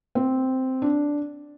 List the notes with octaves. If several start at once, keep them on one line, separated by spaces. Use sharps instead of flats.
C4
D4